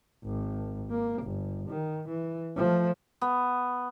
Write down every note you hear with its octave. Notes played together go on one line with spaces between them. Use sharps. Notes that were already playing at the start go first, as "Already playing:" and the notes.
G#1
A#3
G1
D#3
E3
F3 A3
B3